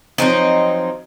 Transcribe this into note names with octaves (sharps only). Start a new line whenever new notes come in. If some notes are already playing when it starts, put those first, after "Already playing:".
F3 F#3 C4 D#4